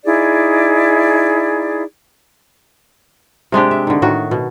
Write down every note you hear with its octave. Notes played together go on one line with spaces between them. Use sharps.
D#4 E4 G#4 D5
C3 G#3 D4 G4
E5
D3 D#3
A2 D#3 F#4
B2